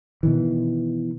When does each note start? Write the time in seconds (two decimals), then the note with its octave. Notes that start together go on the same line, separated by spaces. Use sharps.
0.23 B2 D#3 E3